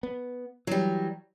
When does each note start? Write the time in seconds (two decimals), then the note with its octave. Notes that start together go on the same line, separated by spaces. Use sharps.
0.03 B3
0.67 E3 F#3 G3